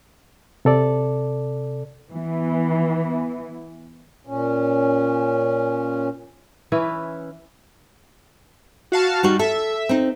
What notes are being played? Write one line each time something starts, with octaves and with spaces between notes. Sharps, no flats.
C3 A4 D5
E3 B3
A#2 C#4
E3 C#4 E4 B4
F#4 F5 A5
G3 D#4 F#4
A4 E5
C4 D#4